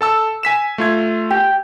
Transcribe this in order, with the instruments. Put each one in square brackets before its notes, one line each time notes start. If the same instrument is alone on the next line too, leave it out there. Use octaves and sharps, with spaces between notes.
[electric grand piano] A4 A5 E6
G#5 B6 E7
A3 F4 G#6
[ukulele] G4